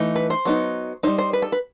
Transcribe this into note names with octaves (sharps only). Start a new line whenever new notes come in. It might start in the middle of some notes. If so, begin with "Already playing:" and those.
Already playing: E3 A3 D#4
B4
C5
F#3 B3 D#4
G3 D#4 C5
C5
B4
A4
B4